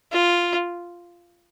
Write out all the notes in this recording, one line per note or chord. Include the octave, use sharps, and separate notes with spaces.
F4